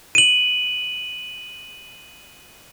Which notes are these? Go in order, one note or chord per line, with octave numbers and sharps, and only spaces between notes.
D#7 F#7